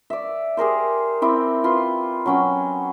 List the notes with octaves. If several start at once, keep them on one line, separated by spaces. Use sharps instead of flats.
D5 E5
G4 G#4 A#4 C5
C4 E4 G4
F4 B4 C6
F#3 C#4 G5